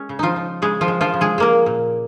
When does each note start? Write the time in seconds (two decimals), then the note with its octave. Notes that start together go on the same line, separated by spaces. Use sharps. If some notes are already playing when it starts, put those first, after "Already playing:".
Already playing: G#3 C#4
0.09 C#3
0.19 F3 D#4 F4
0.36 F3
0.62 C#3 G#3 G#4
0.81 F3 F4
0.88 G#3
1.01 F3 F4
1.14 C#3
1.21 G#3 G#4
1.38 G#3 A#3 A#4
1.66 A#2